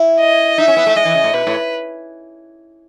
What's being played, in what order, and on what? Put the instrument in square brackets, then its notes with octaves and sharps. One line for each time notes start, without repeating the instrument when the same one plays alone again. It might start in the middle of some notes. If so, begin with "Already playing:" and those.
Already playing: [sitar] E4
[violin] D#5
[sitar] D#4 [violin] E5
[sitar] C#4
B3
A3
[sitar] G#3 [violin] D#5
[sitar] E3
C#3
A2
[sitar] B2 [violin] B4
[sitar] A2